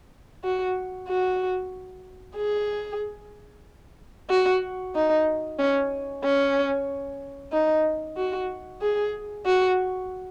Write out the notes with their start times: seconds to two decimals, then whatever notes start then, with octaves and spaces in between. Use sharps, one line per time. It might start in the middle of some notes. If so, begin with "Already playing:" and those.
0.44 F#4
1.08 F#4
2.37 G#4
4.30 F#4
4.95 D#4
5.59 C#4
6.24 C#4
7.53 D#4
8.17 F#4
8.82 G#4
9.46 F#4